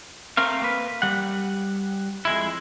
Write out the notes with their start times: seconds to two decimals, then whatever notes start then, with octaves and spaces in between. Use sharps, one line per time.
0.37 A3 C4 A#4 F5
0.62 A#3 B4
1.02 G3 F#5
2.25 F2 G#3 E4